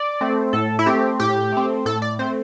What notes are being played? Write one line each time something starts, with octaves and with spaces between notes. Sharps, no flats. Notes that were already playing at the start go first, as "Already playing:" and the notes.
Already playing: D5
A3 C4
A2 A4
E4
A3 C4 G4
A2 G4
A3 C4
A2 A4
D5
A3 C4 C5